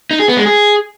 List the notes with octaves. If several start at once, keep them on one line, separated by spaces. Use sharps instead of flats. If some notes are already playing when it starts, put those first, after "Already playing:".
D#4
G#4
B3
G#3
G#4